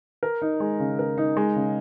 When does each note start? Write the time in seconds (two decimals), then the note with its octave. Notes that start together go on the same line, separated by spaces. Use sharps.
0.23 A#4
0.42 D#4
0.60 G#3
0.80 C#3
0.99 A#4
1.18 D#4
1.37 G#3
1.56 C#3